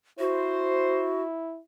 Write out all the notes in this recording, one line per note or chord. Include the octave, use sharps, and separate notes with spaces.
E4 F#4 C5